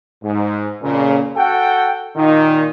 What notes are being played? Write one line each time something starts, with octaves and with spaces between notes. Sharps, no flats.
G#2
F2 A#2 C#3
F#4 A4 F#5 G5
A#2 D#3 D#4